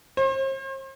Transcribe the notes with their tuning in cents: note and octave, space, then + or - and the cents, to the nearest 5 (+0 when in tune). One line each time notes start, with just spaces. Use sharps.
C5 +40